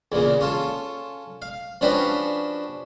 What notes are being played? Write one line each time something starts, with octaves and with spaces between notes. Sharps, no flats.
E2 A#2 C#3
C#4 F4 A4
F5
F3 C#4 D4 F#4 G4 B4